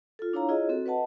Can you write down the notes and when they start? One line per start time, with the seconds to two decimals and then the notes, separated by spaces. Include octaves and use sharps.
0.19 F4 A4
0.33 D4 E4 C#5 F5 A#5
0.49 E4 F4 G#4 C#5 D#5
0.69 C4 F#4 A4
0.86 B4 D#5 F#5 A5